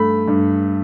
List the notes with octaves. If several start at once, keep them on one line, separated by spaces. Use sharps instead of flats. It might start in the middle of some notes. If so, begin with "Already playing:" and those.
Already playing: G2 A3 B5
G2